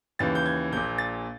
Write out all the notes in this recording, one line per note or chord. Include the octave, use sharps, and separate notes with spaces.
D#2 C#3 E3 A6
G6
G#6
A#1 A#2 G6
A6